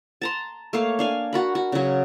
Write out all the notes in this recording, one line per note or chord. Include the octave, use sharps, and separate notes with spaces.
A5 A#5 C6
A3 A#3 C#5 F5
D4 F5 G#5
F#4 A#4 B5
F#4
C#3 F#3